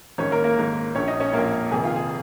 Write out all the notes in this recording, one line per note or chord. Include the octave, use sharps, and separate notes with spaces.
G#1 G#2 D#3 C#4 C#5
A#3 A#4
A#3 A#4
G#1 G#2 D#3
A#1 A#2 C#4 C#5
D#4 D#5
C#4 C#5
A#1 A#2 A#3 A#4
F1 F2 D#3 G#4
F4
G#4